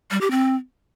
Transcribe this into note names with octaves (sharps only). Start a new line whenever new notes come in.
G3
G4
C4